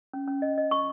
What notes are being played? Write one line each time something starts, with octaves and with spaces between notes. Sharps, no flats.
C#4
C#4
D#5
D#5
C#6